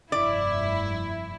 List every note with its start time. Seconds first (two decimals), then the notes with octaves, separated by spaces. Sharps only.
0.12 F1 G2 E4 D5